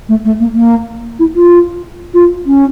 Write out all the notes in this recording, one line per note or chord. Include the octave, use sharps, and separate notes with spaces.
A3
A3
A#3
A#3
E4
F4
F4
C#4